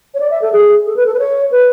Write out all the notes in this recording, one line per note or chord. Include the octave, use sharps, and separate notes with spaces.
C#5
D5
E5
A4
G#4
A4
B4
A4
B4
C#5
B4